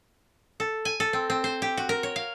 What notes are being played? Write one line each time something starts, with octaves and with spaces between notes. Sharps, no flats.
A4
G#5
A4
C4
C4
C5
G4
F#4
A#4
C#5
F5